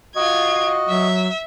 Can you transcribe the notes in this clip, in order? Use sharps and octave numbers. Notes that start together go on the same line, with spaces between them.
F4 F#4 D#5 G#6
F#3 E5